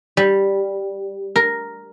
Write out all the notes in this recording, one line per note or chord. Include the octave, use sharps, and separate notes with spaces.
G3
A#4